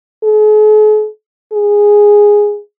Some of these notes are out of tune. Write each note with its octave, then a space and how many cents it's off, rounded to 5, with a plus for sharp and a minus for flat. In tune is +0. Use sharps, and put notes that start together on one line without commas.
G#4 +45
G#4 -5